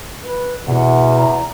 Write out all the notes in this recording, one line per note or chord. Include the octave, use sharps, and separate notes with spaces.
B4
E2 B2 F#5
A#5